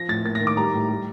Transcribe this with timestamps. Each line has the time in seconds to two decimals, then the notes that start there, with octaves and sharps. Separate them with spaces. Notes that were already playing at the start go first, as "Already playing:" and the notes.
Already playing: F3 A#6
0.08 A2 A6
0.25 A#3 A6
0.35 A#6
0.41 D#3
0.47 D6
0.57 G3 A#5
0.73 A2
0.89 G3